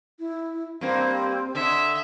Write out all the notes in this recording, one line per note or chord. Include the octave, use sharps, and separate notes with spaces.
E4
G2 A#3 C4
D3 D#5 E5